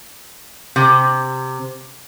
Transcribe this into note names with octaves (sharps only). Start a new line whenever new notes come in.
C3